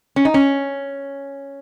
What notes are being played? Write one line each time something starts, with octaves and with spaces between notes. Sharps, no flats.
C#4
D#4
C#4